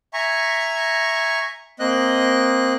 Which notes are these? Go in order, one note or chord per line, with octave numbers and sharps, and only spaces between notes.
E5 G#5 A#5 C#6
A#3 C4 D#5 F#6